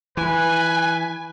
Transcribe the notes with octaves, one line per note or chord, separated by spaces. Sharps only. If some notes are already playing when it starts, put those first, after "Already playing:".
E3 B4 G#5